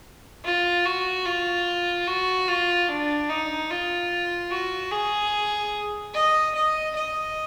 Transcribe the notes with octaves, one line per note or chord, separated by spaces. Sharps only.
F4
F#4
F4
F#4
F4
D4
D#4
F4
F#4
G#4
D#5
D#5
D#5